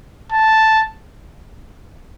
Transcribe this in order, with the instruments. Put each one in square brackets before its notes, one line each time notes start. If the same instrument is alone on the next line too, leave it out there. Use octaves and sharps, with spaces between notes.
[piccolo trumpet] A5